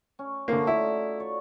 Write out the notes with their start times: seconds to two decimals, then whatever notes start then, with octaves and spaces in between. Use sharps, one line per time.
0.19 C#4
0.48 D3 A3 A#3 F4 F#4
0.67 D#4 E4 D5
1.20 C#5 D5